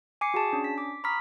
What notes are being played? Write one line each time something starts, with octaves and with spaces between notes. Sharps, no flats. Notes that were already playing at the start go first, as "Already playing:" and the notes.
G#5 D6 C7 C#7
F#4 G#4 A5
C#4 D4
B6
D6
A#5 B5 C#6 D#6 F6 B6